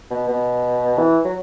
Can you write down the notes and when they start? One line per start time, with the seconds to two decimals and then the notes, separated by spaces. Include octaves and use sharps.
0.11 B2
0.28 B2
0.98 E3
1.25 F#3